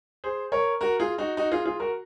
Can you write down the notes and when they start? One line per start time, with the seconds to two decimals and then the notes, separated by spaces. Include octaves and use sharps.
0.24 G#4 C5
0.52 A#4 C#5
0.81 F#4 A#4
1.00 F4 G#4
1.18 D#4 F#4
1.37 D#4 F#4
1.51 F4 G#4
1.65 F4 G#4
1.80 F#4 A#4